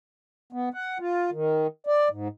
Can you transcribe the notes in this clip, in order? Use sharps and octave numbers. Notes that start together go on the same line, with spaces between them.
B3
F#5
F4
D#3
D5
G#2